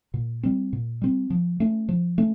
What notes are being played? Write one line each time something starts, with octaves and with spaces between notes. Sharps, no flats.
A#2
G3 C4
A#2
G3 C4
F3
A3 C#4
F3
A3 C#4